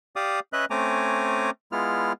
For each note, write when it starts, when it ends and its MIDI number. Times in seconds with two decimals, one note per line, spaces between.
0.16 0.40 67
0.16 0.40 74
0.16 0.40 77
0.16 0.40 86
0.16 0.40 87
0.53 0.65 61
0.53 0.65 71
0.53 0.65 75
0.53 0.65 76
0.53 0.65 90
0.70 1.50 57
0.70 1.50 60
0.70 1.50 61
0.70 1.50 80
0.70 1.50 82
0.70 1.50 86
1.72 2.13 56
1.72 2.13 59
1.72 2.13 64
1.72 2.13 65
1.72 2.13 89